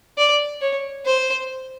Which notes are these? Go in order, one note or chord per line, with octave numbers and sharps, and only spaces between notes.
D5
C#5
C5